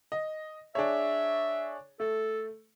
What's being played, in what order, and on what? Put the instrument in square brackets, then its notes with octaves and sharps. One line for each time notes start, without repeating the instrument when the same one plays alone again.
[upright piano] D#5
[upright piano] D4 G#4 C#5 [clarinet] E5
[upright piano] A3 [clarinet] A4